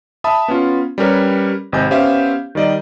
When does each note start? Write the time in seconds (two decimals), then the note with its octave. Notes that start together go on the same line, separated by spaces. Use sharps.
0.24 E5 A5 B5 D#6
0.48 B3 C#4 F4
0.98 G3 C#4 G4 A#4 B4 C#5
1.73 G#1 C3 D#5 G#5 G6
1.91 B3 C#4 G4 C5 E5 F5
2.55 D#3 G3 D5 D#5